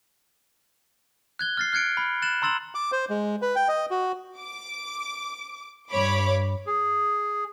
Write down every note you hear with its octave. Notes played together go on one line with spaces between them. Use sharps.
F#6 G#6 G7
F6 A6 C7
F6 F#6 G#6 C#7 D7
B5
F#6 A6 E7 F#7
A#5 C6 E6 A6 E7 F#7
D6
C5
G#3
B4
G5
D#5
F#4
D6
G2 C#5 B5 D6
G#4